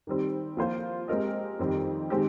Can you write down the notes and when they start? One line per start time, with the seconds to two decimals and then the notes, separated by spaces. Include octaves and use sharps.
0.07 D#3 G3 C4
0.57 F3 A#3 F4 C5
1.08 G#3 C4 G4 A#4 D#5
1.59 F2 D#3 G3 C4 D#4
2.10 D#3 G#3 C4 G4